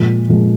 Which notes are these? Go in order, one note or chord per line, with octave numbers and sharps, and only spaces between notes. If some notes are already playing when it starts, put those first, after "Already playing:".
Already playing: A#2 F3 G#3
A#2 F3 G#3